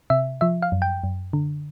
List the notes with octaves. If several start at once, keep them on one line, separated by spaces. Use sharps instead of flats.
C3 E5
F3 E5
F5
F#2
G5
F#2
D3